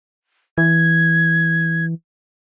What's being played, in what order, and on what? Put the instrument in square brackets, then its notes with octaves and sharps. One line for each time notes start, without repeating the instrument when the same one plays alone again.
[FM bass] E3 [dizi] G#6